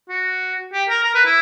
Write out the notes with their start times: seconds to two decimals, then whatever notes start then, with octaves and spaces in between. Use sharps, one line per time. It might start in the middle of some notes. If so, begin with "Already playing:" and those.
0.09 F#4
0.72 G4
0.89 A#4
1.04 A#4
1.15 B4
1.25 E4